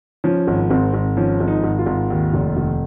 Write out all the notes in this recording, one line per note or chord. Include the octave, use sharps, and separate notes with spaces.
F3 C#4
G#1
G#1 C4
G#1
F3 C#4
G#1
D#4
G#1
F4
G#1
D#2
F1
F1